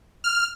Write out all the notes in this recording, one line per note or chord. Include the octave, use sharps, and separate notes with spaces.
F6